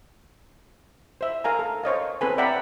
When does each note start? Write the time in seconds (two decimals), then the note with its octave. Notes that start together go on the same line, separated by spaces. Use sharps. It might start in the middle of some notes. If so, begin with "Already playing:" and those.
1.21 C5 E5
1.44 A#4 F5 G#5 A#5
1.59 A4
1.84 C5 C#5 D#5 F5
2.21 C4 A4 B4 G#5
2.38 D5 E5 F#5 G5 A#5 B5